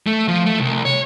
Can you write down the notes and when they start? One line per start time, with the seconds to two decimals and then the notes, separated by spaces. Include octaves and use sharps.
0.07 A3
0.28 F3
0.46 A3
0.59 C2
0.85 C#5